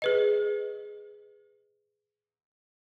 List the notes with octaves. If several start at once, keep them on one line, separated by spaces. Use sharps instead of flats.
G#4 B4 D#5